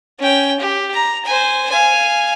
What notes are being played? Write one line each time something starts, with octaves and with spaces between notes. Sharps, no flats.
C#4 G5
G4
A#5
C5 G#5
F5 G#5